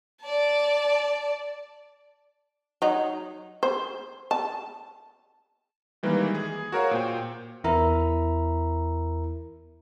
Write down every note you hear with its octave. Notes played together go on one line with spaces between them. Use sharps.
D5 A5
F#3 D#4
C5
A5
D#3 E3 G3 G#3 A#3 E4
G#4
F#4 A#4 C#5 F5
A#2 C5 G5
E2 E4 A#4 E5 A#5